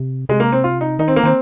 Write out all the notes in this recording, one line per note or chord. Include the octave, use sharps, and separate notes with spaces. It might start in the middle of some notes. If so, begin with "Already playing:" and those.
Already playing: C3
C3 G#3
A#3
C4
F4
D#4
D#3 D#4
C4
A#3
D#3 C4